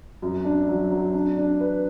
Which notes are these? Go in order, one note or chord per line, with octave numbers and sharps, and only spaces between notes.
F#2
D4
F#3
F#3
D4
D4
B4